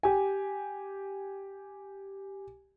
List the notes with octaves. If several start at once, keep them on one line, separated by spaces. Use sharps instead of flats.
G4 G#5